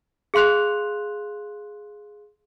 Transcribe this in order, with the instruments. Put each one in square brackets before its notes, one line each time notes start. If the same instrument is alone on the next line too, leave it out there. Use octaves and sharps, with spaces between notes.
[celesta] G#4 F5 C6 F#6 F7